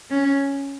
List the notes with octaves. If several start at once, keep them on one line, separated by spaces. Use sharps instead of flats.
C#4